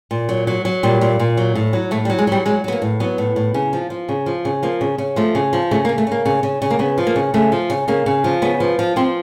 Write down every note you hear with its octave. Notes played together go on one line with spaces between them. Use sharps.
A#2
F#3
F#3
F#3
A#2 G3
A#2
A#2
F#3
A2
F#3
A2 A3
G3
F#3
G#3
F#3 G3
F#3 G#3
F#3 B3
A#3
A2
F#3 B3
A2
A2
C#3
F3
F3
C#3
F3
C#3
F3 A#3
C#3
C#3
F3 A3
C#3
F3
C#3 A3
A#3
C#3
A3
C#3 A#3
C#3
C#3
C#3
A#3
C#3 B3
F3
A#3
C#3
C#3 A3
F3
C#3
C#3 A#3
C#3
F3
C#3 B3
F3
F3
F3 C4